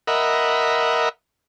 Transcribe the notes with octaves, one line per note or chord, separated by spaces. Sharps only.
A#4 D#5 E5 F#5 B5